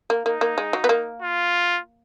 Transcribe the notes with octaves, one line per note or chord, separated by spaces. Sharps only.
A#3
A#3 D#4
A#3
G#3
F#3
B3
A#3
F4